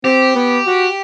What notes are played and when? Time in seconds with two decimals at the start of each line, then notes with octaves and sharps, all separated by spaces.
0.04 C4 G4
0.36 B3
0.67 F#4